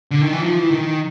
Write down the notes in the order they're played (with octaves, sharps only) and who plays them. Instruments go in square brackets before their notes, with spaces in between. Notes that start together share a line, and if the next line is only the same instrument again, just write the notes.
[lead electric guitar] D3
D#3
E3
F3
E3
D#3